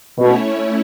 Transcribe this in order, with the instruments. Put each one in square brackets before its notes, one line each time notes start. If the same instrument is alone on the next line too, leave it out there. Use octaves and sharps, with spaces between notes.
[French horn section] B2 [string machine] A3 C#4 E4 C#5